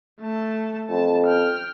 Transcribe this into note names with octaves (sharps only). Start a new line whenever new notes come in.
A3 A5
F2 A5
G5 F6